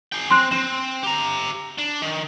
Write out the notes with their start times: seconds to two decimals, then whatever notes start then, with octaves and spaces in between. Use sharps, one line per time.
0.12 G#4 G5
0.31 C4 C6 F#6
0.52 C4 E7
1.03 G4 A#5
1.78 D4
2.02 D#3